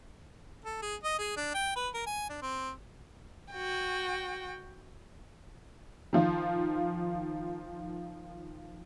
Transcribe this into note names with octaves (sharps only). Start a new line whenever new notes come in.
A4
G#4
D#5
G#4
D4
G5
B4
A#4
G#5
D4
C4
F#4 G5
D#3 F3 F4